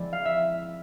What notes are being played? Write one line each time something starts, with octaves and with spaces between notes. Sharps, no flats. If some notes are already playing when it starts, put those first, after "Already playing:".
Already playing: F3 G#3 C4 E4 D5
F5
E5